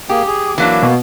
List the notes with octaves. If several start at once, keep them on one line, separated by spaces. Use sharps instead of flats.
A#3 G4 G#4
G#4
E3 F#3 A#3 D4
B2